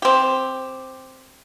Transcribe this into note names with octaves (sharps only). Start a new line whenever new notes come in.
C4 G4